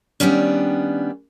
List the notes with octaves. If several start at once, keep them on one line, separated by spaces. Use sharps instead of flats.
D#3 G3 G#3 B3 C#4 D4